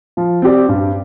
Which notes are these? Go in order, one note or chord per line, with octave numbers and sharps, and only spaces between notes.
F3
C4 G4 D5
G2